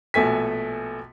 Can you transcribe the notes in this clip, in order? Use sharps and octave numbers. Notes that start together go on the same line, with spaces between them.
A#1 B2 A3 A4 G#5 B6